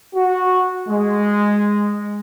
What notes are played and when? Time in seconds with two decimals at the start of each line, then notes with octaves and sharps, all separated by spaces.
0.15 F#4
0.89 G#3